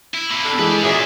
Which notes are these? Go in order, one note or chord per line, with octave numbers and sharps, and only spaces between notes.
E4
C3 A#3 B5
D4 G4 A4
E3 G#3 G#4 B4 D5
F#2 A#2 G#4 E5 D6